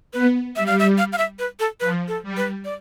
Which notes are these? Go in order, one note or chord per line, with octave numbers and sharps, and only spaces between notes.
B3 B4
G3 E5
F5
E5
F5
F5
E5
B4
A4
F3 B4
A4
G3
B4
D5